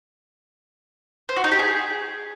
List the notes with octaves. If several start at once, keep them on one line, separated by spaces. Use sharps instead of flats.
C5
F#4
D#4
G4
G#4